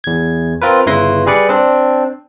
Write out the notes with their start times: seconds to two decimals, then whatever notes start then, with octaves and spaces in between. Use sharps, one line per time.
0.04 E2 G#6
0.62 C4 F4 A#4 B4
0.86 G1 C#3 E4 B4 C6 A#6
1.26 G3 G#4 B4 D5 C#7
1.49 C4 D4